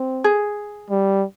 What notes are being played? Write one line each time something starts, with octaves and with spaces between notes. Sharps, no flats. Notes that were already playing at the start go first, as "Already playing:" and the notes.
Already playing: C4
G#4
G3